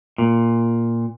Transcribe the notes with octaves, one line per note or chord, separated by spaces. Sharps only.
A#2